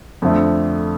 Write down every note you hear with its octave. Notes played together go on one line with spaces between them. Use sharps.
F2 D3 F3 A3